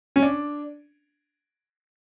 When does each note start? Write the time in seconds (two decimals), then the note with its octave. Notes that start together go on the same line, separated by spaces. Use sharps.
0.16 C#4
0.23 D4